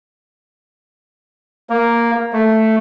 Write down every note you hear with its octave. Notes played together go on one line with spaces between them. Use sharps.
A#3
A3